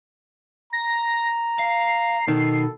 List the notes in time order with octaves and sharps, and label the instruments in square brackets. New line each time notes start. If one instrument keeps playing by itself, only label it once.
[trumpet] A#5 [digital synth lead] A#6
[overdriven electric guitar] F5 [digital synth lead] C7
[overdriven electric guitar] B2 [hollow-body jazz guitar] D#3 [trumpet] A4